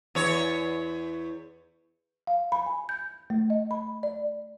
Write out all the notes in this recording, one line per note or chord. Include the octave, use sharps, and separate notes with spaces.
E2 C#5
F5
B5
G#5
G6
A3
D#5
B5
D5